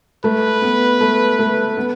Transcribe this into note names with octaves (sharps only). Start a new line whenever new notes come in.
A3 B4
B3
A3
A3
B3